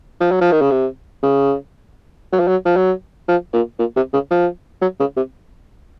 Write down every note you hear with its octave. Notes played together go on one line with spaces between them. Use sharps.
F3
F#3
F3
D#3
C#3
C3
C#3
F#3
F3
F#3
F3
F#3
F3
A#2
A#2
C3
C#3
F3
F#3
C#3
C3